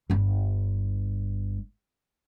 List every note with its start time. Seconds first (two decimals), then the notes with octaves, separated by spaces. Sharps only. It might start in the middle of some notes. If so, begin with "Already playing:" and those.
0.10 G1 G2